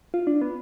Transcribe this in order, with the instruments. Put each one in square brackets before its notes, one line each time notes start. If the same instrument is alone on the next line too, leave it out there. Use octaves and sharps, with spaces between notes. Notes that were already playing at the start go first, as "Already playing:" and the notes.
[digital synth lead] F4
D4
B3